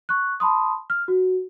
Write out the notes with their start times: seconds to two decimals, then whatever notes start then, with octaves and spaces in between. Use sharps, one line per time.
0.09 C#6 F#6
0.40 A5 B5 C6 D#6
0.90 F6
1.08 F#4